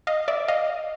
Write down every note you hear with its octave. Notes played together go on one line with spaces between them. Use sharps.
D#5 F5
D5 E5
D#5 F5